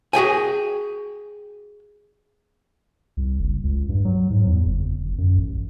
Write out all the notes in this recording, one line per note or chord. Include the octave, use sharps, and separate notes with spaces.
F#4 G#4 G5 G#5
C2
F#1
C#2
G2
F#3
G#2
E2
F#1
G1
F#2
A1